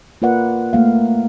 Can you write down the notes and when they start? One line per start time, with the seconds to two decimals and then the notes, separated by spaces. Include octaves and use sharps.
0.22 A#3 F4 A#4 B4 D5 F#5
0.73 A3 A#3 F5